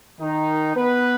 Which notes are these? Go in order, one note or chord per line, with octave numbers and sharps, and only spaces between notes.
D#3 D#4
B3 B4